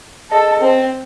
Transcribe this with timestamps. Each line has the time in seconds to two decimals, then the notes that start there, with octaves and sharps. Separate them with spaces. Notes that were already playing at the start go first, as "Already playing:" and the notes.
0.31 G#4 A4 D#5 A5
0.61 C4